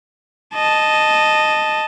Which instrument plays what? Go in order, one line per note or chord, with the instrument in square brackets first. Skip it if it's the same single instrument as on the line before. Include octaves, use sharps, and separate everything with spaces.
[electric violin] D#5 A5